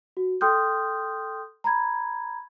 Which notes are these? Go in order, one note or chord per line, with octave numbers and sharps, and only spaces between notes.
F#4
A4 G5 C6 D#6 F6 G6
A#5 B5 G#6